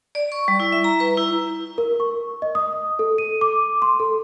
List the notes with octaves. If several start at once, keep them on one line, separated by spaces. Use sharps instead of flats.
D5
C#6
G3
E4
E5
A#5
B4
E4
A#4
C#6
D#5
D#6
A4
D#7
D6
C6
A4